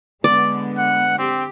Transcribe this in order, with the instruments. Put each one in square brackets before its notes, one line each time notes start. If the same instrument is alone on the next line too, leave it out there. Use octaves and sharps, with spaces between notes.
[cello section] D3 G#3 B3 [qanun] D5
[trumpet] F#5
[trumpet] C4 [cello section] G4